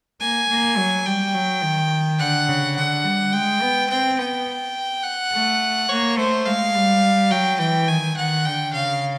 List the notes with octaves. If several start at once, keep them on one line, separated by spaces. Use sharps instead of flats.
A#3 G#5
A#3
F#3
G3 G5
F#3
D#3
D3 F#5
C#3
D3 F#5
G3
G#3 G5
B3
C4 G5
B3 G5
F#5
A3
A#3 C#5
A3 C5
G#3 F5
G3
F#3 G5
E3 G5
D#3 G#5
D#3 F#5
D3 G5
C#3 F5